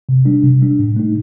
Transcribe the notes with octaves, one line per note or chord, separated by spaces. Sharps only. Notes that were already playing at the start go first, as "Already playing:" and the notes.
C3
G3 D4
C3
G3 D4
A2
A3 D#4